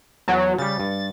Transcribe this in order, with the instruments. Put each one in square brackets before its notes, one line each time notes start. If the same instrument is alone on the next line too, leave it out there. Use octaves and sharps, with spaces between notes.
[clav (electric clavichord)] E2 F#4 A5 [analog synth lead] F#3
[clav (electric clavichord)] C#3 G3 [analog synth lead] A6
[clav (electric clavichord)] G2